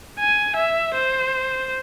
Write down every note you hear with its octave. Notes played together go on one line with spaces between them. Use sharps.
G#5
E5
C5